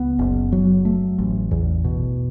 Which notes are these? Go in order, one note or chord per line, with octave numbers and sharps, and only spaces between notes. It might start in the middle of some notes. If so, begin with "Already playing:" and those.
Already playing: C#2 B3
F#1
F#3
A3
A1
E2
B2